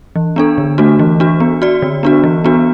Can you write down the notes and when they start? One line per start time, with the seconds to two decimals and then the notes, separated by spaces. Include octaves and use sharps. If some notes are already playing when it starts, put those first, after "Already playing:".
0.16 E3
0.36 B3 D4 A4
0.58 D3
0.78 A3 D4 F#4
0.99 E3
1.20 D4 F#4
1.40 B3
1.62 F#4 D5
1.82 D3
2.03 B3 D4 F#4
2.24 E3
2.45 B3 D4 F#4